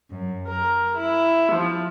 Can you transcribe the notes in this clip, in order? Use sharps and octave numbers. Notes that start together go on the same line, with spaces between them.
F#2
A#4
E4
F3